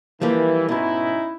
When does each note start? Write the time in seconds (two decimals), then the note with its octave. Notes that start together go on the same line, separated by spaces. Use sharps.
0.21 E3 F3 G3 A#3
0.69 G#2 B2 C#4 D#4 E4